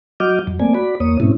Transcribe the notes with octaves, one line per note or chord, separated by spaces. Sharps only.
F#3 F#4 D#5 D6 F6 G6
F2 F#3
A3 A#3 C4 D5 G#5
F#4 D5 B5
E2 A#3 C#5 D#6
G#2 B2 A3 C4 C#4 E4